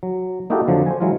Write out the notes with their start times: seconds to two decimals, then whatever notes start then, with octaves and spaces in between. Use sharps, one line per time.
0.03 F#3
0.50 A#3 D#4 E4 F#4 G4 A4
0.67 F2 D3 F3 F#3
0.86 C5 G#5
1.00 E3 F#3 G#3 E4 F4